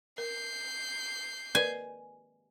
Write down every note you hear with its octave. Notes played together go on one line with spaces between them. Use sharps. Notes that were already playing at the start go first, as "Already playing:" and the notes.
A#4 G6 C7
A#4 B4 D5 G#5